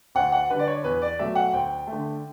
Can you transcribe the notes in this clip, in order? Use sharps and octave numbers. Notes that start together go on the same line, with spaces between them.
D2 F#5
F#5
D3 G3 B4
D5
C#5
E2 B4
D5
B2 F#3 A3 E5
F#5
D2 G5
A3
D3